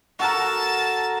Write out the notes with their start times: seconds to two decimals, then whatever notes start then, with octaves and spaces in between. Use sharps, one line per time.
0.19 F#4 A4 A#4 A5